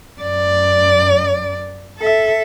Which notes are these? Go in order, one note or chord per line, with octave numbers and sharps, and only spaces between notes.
F#2 D5
A4 E5